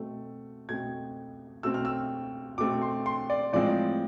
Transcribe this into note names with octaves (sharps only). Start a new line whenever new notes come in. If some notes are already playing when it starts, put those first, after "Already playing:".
Already playing: B2 A3 C4
B2 A3 C4 G#6
B2 A3 C4 E6
F6
E6
B2 A3 C4 D6
C6
C6
D5
A2 F3 G#3 C4 D5